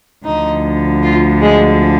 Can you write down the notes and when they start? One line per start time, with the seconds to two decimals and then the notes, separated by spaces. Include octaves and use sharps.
0.25 D2 D3 F3 D#4
1.02 F4
1.41 G#3